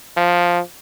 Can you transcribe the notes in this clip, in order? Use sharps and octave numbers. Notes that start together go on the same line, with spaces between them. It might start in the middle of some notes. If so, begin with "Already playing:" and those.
F3